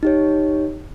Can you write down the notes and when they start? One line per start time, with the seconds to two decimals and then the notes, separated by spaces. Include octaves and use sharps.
0.03 D#4 G4 C#5